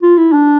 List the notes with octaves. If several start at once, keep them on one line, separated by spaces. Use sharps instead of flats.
F4
E4
D4